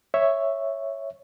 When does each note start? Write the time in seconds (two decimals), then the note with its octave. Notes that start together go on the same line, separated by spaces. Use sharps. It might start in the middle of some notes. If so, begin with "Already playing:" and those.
0.14 C#5 E5